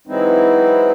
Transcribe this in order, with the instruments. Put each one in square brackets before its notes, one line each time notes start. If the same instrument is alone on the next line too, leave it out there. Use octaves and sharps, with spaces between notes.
[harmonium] E3 F#3 G#3 C4 D#4 E4